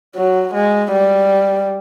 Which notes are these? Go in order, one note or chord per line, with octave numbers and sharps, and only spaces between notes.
F#3
G#3
G3